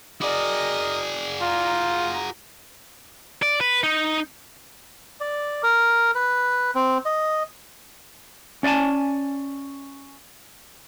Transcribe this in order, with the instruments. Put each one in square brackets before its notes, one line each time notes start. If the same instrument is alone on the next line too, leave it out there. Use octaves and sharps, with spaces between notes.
[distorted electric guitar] F#4 G#4 [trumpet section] A#4 D#5 [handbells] D5 D6
[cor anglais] F4 [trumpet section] A#5
[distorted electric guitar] D5
B4
D#4
[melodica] D5
A#4
B4
C4
D#5
[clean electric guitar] C#4 D5 D#5 G#5 A5